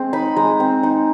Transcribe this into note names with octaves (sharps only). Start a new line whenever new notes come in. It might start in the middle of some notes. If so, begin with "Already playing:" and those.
Already playing: G#3 C4
D#4 B5
G#3 A#5
C4
D#4